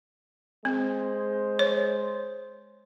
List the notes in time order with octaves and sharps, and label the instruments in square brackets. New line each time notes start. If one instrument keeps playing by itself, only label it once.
[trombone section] G#3 C5 [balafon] C4
[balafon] C#5